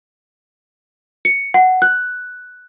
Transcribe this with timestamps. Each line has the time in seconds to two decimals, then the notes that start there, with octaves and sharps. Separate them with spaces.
1.25 C#7
1.54 F#5
1.82 F#6